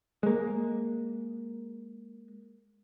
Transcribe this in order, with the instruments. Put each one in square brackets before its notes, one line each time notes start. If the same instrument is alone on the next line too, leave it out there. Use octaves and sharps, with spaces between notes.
[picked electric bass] G#3 A#3